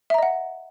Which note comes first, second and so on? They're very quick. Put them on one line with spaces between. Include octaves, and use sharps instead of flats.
E5 A#5 D#5 F#5